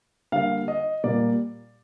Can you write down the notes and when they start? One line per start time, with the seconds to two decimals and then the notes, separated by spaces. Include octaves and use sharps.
0.32 D3 G3 A#3 F5
0.68 D#5
1.04 A#2 G3 A#3 D5